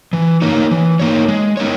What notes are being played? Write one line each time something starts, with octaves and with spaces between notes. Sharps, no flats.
E3
A#3 D#4 A#4 C#5
E3
A#3 D#4 A#4 C#5
G#3
B3 D#4 A#4 C#5